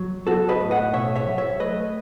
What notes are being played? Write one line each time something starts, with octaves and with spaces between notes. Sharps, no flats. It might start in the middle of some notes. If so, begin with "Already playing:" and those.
Already playing: F#3
B3 F#4 A4
B4 D#5
A2
D#5 F#5
B2 C#5 E5
C#5 E5
F#3
C#5 E5
A3 B4 D#5